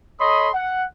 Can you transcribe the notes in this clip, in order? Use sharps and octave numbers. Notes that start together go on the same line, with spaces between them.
A4 C#5 D#5 B5 C6 D#6
F#5